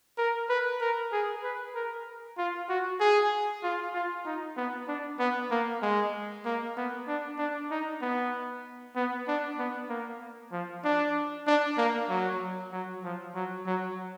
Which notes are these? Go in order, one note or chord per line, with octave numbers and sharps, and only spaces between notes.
A#4
B4
A#4
G#4
B4
A#4
F4
F#4
G#4
F4
F4
D#4
B3
D4
B3
A#3
G#3
A#3
B3
D4
D4
D#4
B3
B3
D4
B3
A#3
F3
D4
D4
A#3
F#3
F#3
F3
F#3
F#3